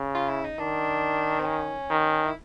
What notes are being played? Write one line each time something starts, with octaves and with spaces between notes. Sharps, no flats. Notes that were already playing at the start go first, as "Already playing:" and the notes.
Already playing: C#3
F4
E4
D#4
D#3 D4
C4
C#4
D#3
E4